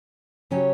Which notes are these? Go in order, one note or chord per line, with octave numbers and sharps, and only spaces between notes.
C#3 F#3 C#4 G4 C#5